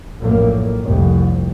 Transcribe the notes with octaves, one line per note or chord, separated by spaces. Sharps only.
A#1 F#2 A2 A#3
F1 C2 F2